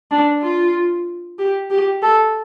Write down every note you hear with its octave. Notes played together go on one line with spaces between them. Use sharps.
D4
F4
G4
G4
A4